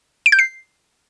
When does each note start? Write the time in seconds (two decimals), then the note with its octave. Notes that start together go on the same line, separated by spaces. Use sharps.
0.26 D7
0.32 G6
0.39 C7